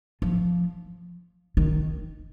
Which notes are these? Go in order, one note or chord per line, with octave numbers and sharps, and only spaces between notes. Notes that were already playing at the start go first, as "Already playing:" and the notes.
F3
D#3